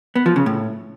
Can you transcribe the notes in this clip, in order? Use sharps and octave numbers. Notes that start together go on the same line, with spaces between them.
B3
F3
C#3
A2